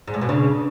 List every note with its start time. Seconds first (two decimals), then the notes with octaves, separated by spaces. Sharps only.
0.08 G#2
0.14 A2
0.21 B2
0.29 C#3 D4